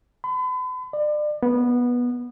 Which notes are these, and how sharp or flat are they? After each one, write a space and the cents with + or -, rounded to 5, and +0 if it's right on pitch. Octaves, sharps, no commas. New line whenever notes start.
B5 +40
D5 +35
B3 -15